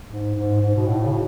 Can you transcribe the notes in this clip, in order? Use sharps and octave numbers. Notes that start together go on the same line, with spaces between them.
G#2
G#2
G#2
B2
A2
C#3
B2